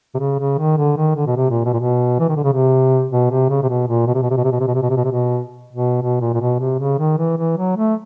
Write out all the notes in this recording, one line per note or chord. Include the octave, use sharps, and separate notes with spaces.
C3
C#3
C#3
D#3
D3
D#3
D3
B2
C3
A#2
B2
A#2
B2
E3
D#3
D3
C#3
C3
B2
C3
C#3
C3
B2
A#2
B2
C3
B2
C3
B2
C3
B2
C3
B2
C3
B2
C3
B2
C3
B2
B2
B2
A#2
A#2
B2
C3
C#3
D#3
E3
E3
F#3
A3